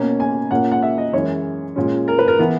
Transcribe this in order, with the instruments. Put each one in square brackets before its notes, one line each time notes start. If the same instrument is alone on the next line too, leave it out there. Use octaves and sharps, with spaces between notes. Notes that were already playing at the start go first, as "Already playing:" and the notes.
Already playing: [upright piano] B2 A#3 C#4
G#5
A#2 A#3 C#4 F#5
F#5
E5
D#5
F#2 E3 G#3 C#5
A#2 G#3 C#4
A#4
B4
A#4
E3 B3